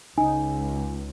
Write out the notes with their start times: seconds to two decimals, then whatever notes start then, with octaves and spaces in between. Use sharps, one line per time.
0.18 C#2 D#4 G#5